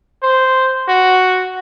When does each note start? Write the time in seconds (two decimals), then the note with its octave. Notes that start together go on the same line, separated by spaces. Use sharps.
0.23 C5
0.88 F#4